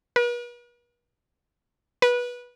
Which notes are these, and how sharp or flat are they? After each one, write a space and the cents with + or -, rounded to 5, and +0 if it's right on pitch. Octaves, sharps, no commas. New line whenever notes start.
B4 -45
B4 -20